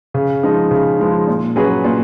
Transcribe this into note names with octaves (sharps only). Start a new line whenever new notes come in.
C#3
F3 G#3 D#4
C#3
F3 G#3 D#4
A#2
F#3 C#4 G#4 B4
A#2